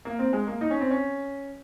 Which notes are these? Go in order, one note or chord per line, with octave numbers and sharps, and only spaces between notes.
A#3
C4
G#3
A#3
D#4
C#4
C4
C#4